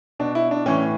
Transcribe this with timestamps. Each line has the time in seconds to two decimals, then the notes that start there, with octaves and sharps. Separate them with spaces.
0.19 B2 D4
0.35 E4
0.51 D4
0.66 A2 E3 C#4